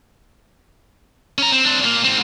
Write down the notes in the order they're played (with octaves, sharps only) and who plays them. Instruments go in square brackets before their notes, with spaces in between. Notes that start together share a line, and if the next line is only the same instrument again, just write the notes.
[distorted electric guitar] C#4 A#5
C4
C4 D4
A#2 A#3
G#2 C4